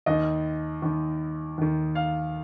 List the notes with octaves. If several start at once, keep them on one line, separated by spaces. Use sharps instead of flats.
D#2 D#3 D#5
D#2 D#3
D#2 D#3
F5